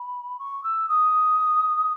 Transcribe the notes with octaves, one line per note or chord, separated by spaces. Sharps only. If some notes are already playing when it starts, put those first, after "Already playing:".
Already playing: B5
C#6
E6
D#6